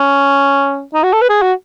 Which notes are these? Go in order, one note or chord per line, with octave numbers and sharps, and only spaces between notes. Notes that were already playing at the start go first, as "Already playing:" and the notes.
Already playing: C#4
D#4
F#4
A4
B4
G#4
F#4